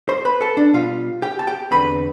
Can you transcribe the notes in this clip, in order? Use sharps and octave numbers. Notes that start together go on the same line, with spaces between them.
C5 C6
B4 B5
A4 A5
D4 D5
B2 G3 B3 F4 F5
G4 G5
A5
G4 G5
E2 D3 A3 C4 B4 B5